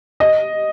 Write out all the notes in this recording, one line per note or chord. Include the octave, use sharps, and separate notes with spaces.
D#5